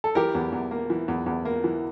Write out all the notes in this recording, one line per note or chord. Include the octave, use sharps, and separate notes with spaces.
A4
E3 G4 A#4
E2
E2
A#3
E3
E2
E2
A#3
E3